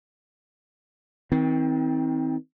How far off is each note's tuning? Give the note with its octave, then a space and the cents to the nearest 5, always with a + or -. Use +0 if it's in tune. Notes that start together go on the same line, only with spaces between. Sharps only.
D#3 +40 C4 +0